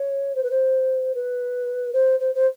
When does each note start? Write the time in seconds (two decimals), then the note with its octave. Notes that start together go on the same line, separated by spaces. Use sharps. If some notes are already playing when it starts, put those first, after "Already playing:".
Already playing: C#5
0.35 C5
0.43 B4
0.50 C5
1.14 B4
1.93 C5
2.19 C5
2.35 C5